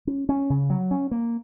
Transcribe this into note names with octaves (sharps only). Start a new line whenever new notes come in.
C#4
C#4
C#3
F#3
C#4
A#3